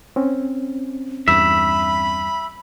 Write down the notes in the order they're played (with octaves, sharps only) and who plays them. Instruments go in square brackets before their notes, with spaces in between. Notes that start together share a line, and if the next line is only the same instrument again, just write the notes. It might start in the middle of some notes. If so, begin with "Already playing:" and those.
[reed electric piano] C4 C#4
[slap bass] E2 G2 [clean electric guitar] E5 [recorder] B5